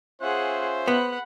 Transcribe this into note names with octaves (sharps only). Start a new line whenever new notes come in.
C#4 F4 G#4 C5 E5 F#5
B3 F#5 B5